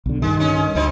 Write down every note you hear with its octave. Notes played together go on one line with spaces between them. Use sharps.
B1 D3
G2 D#3 G#3
G#3 C#4
D2 C4 D#4 E4